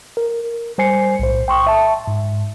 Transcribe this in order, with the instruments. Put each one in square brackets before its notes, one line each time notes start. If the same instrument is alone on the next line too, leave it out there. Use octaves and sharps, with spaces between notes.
[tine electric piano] A#4
G3 C5 G#5 C7 C#7
B1 A2 C5
G5 C6 C#6 D#6
E5 A5
G#2